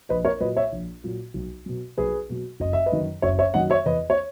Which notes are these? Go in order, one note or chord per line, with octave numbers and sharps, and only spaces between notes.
A#1 B4 D#5
A#4 C#5
A#2 F#3 B4 D#5
C#5 E5
A#1
A#2 F#3
B1
B2 F#3
B1 G#4 B4
B2 F#3
F#1 D#5
E5
B4 D#5
F#2 D#3 F#3
F#1 C#5 E5
C#5 E5
F#2 D#3 F#3 D#5 F#5
C#5 E5
E2 B4 D#5
C#5